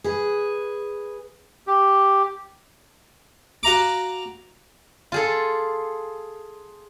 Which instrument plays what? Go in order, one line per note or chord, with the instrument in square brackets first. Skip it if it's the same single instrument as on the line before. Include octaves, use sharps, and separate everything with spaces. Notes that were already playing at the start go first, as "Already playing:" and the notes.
[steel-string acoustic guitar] G#4 B4
[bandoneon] G4
[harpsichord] F#4 F5 A#5 D6
[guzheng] F4 G#4 A4